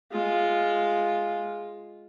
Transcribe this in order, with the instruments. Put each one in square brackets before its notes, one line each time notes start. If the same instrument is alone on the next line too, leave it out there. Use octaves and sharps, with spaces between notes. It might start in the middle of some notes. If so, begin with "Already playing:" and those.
[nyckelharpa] G#3 F4